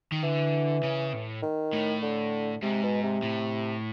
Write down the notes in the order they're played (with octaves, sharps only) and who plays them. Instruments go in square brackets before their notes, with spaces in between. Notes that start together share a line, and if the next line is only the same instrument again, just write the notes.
[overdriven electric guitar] D#3
[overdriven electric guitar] D3 [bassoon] E3
[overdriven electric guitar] C#3
A2
[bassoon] D#3
[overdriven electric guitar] A2
[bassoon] D3
[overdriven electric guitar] G#2 [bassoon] C3
[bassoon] B2
C3
[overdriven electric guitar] A2